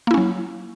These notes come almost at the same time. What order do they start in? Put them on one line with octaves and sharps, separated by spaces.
A#3 E4 C#4 F#3